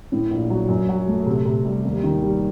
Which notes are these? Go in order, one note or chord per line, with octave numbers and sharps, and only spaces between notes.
A2
A#1
F#3
F#2
F#3
A3
C3
C3
G3
D#2
D#3
G3